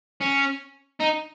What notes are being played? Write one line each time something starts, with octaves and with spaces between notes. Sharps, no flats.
C#4
D#4